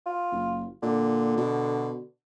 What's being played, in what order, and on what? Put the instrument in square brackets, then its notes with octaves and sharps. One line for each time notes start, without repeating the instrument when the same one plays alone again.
[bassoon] F4
[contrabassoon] F#1
[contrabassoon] A#2 [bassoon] D3
[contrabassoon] B2